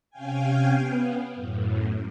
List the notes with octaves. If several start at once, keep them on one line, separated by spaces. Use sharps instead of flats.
C3 C#4 F5 G5 G#5
B3
F#2 A2